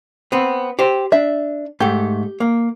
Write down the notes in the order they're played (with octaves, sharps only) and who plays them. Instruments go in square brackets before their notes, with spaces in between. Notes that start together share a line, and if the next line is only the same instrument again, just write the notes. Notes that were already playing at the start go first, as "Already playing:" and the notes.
[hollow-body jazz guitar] B3 C4
G4 C5
[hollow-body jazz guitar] D4 [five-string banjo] E5
[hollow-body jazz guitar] G#2 A3 [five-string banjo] G4
[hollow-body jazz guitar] A#3